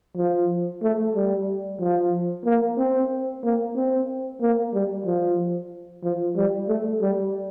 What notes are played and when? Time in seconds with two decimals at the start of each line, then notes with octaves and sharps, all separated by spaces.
0.17 F3
0.83 A3
1.15 G3
1.80 F3
2.45 A#3
2.78 C4
3.44 A#3
3.76 C4
4.41 A#3
4.74 G3
5.06 F3
6.04 F3
6.36 G3
6.69 A3
7.02 G3